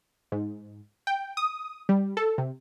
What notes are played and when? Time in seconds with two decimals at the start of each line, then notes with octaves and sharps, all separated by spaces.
0.32 G#2
1.07 G5
1.37 D#6
1.89 G3
2.17 A4
2.38 C3